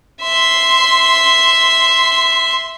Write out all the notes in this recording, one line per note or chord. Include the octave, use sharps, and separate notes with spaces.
E5 C6